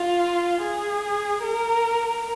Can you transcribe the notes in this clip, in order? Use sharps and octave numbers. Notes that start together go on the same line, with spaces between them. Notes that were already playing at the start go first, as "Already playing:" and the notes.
Already playing: F4
G#4
A#4